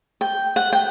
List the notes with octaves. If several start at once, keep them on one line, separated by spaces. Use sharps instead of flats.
G5
F#5
G5